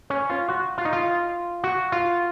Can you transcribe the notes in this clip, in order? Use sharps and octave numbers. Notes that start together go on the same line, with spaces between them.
C#4
F4
F#4
F4
D#4
F4
F#4
F4